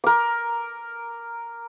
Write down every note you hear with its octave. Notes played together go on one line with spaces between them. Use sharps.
A#4 D6